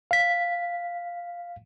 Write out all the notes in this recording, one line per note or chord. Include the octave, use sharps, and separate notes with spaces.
F5 B6